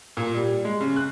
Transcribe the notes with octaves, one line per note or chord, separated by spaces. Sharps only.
A#2
G3
G#3
C#3
F#6